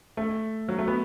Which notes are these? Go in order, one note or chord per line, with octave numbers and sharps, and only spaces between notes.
A3
F#3
A3
B3